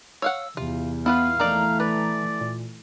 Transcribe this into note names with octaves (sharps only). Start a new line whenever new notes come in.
C#5 F5 F#5 E6
E2 C3 F4
B3 E4 F4 B4 F5
E3 A3 A#3 D#4 D5 A#5
B4 D5
A#2